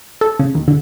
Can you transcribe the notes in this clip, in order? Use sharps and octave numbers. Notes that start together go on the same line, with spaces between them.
A4
C#3
D#2
D3